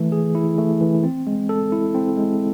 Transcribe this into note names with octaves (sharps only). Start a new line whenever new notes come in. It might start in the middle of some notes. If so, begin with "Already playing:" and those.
Already playing: E3 A3
G#4
E4
A3
E3
C4
G#3
A4
E4
C4
G#3